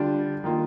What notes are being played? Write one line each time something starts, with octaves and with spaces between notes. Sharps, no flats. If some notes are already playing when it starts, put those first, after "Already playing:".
Already playing: D3 G3 D4 F4
D#3 A#3 F4